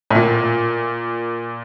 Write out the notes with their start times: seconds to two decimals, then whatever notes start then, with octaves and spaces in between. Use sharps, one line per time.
0.11 A2
0.15 A#2